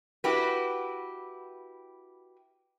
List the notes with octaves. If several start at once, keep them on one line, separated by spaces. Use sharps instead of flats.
E4 F#4 G4 B4